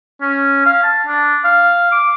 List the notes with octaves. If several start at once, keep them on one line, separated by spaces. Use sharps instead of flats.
C#4
F5
A5
D4
F5
D6